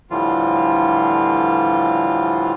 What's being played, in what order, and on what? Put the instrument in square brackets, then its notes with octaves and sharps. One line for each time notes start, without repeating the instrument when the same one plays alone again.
[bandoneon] A2 D3 E3 F3 G3 F4